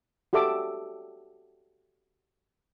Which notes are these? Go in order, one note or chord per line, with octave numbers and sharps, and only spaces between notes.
F#4 G4 A4 E5 D6